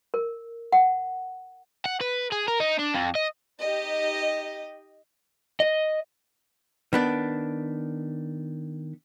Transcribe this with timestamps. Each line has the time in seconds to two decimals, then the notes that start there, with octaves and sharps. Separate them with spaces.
0.14 A#4
0.72 F#5
1.86 F#5
2.01 B4
2.32 G#4
2.48 A#4
2.60 D#4
2.79 D4
2.95 F2
3.15 D#5
3.62 D#4 G4 D#5
5.60 D#5
6.93 D#3 B3 D4